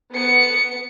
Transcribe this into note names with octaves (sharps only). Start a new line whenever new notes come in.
B3 C#7